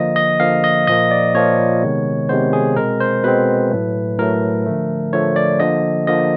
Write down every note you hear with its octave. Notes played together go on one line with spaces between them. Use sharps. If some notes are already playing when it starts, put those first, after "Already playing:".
Already playing: D3 F3 A#3 D#5
D#5
D3 F3 A#3 F5
D#5
A#2 F3 A#3 D#5
D5
A#2 F3 A#3 C#5
C3 D#3 G#3 B3
C3 D#3 G#3 B3 C5
G#4
B2 G#3 C4 A#4
C5
B2 G#3 C4 B4
A2 F#3 A3
A2 F#3 A3 A#4
D3 F3 A3
D3 F3 A3 C#5
D5
D3 F3 A#3 D#5
D3 F3 A#3 D#5